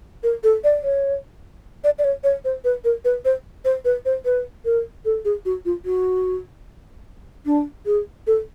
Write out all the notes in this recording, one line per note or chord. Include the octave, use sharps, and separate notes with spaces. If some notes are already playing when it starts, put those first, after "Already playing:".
A#4
A4
D5
C#5
D5
D5
C#5
C#5
C5
B4
A#4
B4
C5
C5
B4
C5
B4
A#4
A4
G#4
F#4
F4
F#4
D4
G#4
A4